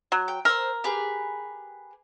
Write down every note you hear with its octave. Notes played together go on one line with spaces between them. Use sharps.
F#3
G5
A#4 C5 E6
G4 G#4 B4